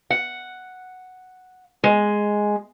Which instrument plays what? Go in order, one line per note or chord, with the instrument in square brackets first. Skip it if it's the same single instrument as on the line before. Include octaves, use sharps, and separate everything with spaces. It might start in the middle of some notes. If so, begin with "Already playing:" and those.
[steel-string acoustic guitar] F#5
G#3